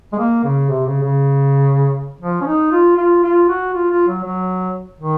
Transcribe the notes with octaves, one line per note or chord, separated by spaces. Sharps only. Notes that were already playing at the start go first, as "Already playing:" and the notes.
G#3
A#3
C#3
C3
C#3
C#3
F3
C#4
D#4
F4
F4
F4
F#4
F4
F4
F#3
F#3
D#3